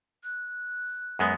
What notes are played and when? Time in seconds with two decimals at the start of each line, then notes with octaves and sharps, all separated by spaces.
0.24 F#6
1.19 F#2 G#3 B3